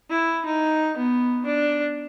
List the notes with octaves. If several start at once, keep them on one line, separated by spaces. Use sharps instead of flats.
E4
D#4
B3
D4